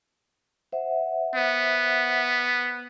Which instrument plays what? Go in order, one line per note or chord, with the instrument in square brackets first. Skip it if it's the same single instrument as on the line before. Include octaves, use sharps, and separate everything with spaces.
[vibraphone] C5 E5 F#5
[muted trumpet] B3